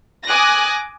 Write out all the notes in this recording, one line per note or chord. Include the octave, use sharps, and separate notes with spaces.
G#5 D6 D#6 F#6 A#6